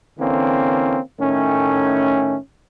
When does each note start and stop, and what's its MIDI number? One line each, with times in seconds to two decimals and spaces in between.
0.19 0.98 50
0.19 0.98 52
0.19 0.98 58
0.19 0.98 60
0.19 0.98 61
1.20 2.36 45
1.20 2.36 51
1.20 2.36 57
1.20 2.36 61